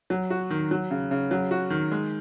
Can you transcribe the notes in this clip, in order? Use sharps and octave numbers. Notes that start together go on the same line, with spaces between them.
F#3
F#4
D#3
F#3
C#3
C#3
F#3
F#4
D#3
G#3